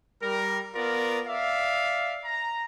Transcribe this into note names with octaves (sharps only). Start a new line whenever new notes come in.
G3 A#4
B3 F4 A#4 D5
D5 E5 F5
A#5